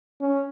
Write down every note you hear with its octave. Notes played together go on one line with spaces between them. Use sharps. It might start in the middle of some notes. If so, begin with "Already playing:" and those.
C#4